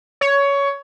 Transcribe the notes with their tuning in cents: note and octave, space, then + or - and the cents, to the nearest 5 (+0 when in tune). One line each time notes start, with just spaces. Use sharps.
C#5 +15